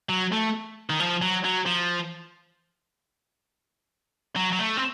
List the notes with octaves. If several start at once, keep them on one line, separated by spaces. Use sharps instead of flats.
F#3
A3
D#3
F3
F#3
F#3
F3
F#3
F#3
A3
C4